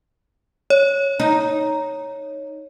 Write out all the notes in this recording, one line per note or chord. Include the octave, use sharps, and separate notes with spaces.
C#5
D#4